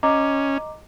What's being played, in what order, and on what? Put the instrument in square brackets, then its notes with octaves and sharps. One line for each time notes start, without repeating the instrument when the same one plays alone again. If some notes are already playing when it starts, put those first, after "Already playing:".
[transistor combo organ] C#4 [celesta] D#5 A#5 D6